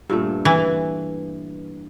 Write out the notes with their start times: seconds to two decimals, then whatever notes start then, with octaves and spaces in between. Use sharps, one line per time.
0.10 G2 A#2 A3
0.45 E3